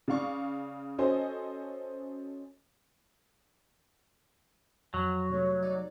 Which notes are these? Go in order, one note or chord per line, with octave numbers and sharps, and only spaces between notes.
C#3 D5 F5 C#6
C#4 F#4 A4 C5 D#5 G#5
F2 F#3 F6
C3 G3 A3 C#5
D#4 D5